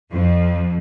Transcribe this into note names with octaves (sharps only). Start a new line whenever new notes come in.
F2